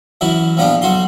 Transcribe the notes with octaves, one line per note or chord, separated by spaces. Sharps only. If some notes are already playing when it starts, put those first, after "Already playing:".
F#2 E3 F#3 E4
A#1 F3 B3 D4 G4
B1 F#3 F#4 C6